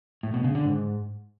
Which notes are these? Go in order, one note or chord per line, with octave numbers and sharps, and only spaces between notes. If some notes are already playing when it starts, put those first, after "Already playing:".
A2
B2
C#3
D3
G#2